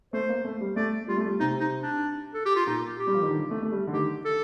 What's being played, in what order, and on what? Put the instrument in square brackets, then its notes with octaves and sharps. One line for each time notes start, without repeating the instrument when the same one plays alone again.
[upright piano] A3 [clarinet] C5
[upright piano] A#3
A3
G3
[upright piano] A3 [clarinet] D5
[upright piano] G3 [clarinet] F4
[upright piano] A3
G3
[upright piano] C3 [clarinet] D#4
[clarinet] D#4
D4
A4
G4
F4
[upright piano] A#2 [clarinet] D#4
[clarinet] G4
[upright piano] G3
F3
D#3
D3
A3
A3
G3
D3
[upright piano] D#3 [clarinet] G4
[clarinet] A4